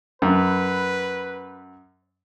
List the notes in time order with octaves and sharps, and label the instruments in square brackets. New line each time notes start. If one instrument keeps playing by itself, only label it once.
[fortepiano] F#2 [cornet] B4